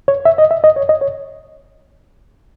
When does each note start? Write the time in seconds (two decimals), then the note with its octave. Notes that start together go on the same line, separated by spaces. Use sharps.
0.08 C#5
0.25 E5
0.38 D#5
0.51 E5
0.64 D#5
0.76 C#5
0.89 D#5
1.01 C#5